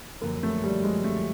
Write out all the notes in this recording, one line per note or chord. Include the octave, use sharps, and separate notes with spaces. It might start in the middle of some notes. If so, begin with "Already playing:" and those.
F#2 D3 F3 A#3
A3
G3
G#3
A3